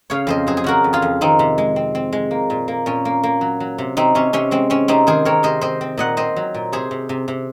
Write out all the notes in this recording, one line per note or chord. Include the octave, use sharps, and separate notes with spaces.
C#3 C#5 F5
F2 C5 D#5
F#3 G#4 C5
G#4
C#3 F#4 A#4
F2
F4 G#4
F2
D#3 C4 D#4
C3
G#3
C4
C4
G#3
A#3
A#2
A#3
A#2 C#4
A#3
A#3
F#3
F#3
C3
C3 C4 D#4
C3 C#4
C3 C#4
G#3 C4
C4 C#4
C3 C4 D#4
D#3 G#4 C5
C4 A#4 C#5
C3 C5 D#5
C4 C5 D#5
C4
A#2 D#5 F#5
C4 C5 D#5
F#3
A#2
C3 G#4 C5
C3
C3
C3